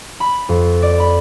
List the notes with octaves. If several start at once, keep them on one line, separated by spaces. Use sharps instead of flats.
B5
F2
D5
B5